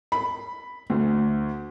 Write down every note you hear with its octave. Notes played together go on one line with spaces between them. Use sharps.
B5
D2